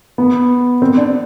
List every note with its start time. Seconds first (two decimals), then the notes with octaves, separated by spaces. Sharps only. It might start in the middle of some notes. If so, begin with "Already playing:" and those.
0.18 B3
0.82 C4
0.97 D4